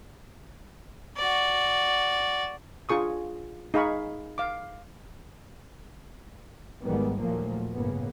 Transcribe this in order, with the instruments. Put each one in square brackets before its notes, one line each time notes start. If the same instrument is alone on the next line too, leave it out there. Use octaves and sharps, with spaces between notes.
[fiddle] F#4 D5
[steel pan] D4 F4 G#4 C#6 D#6
D#4 G#4 F5 B5 C#6
F5 D6
[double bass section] G#1 G#2 D#3 G3 G#3 B3
D#2 A#2 F3 F#3 A3 A#3
G1 A2 C#3 A#3 B3